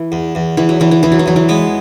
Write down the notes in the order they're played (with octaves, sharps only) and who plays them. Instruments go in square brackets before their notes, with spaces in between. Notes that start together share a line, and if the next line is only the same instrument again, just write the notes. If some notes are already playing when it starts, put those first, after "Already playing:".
Already playing: [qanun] E3
[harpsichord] E2
E2
[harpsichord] E2 [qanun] E3
[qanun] F#3
[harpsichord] E2 [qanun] E3
[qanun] E3
[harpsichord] E2 [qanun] E3
[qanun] F#3
E3
[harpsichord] E2 [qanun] F#3
[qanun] E3
[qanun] G#3 [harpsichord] B3